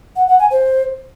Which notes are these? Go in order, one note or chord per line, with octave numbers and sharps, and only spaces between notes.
F#5
F#5
G#5
C5